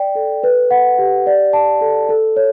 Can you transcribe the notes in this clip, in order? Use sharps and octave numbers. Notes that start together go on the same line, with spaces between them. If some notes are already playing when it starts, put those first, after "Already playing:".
Already playing: D5 G5
A4
B4
F#5
G4
D5
A5
A4
A4
C#5